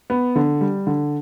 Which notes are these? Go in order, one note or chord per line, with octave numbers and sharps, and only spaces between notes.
B3
D3
G3
D3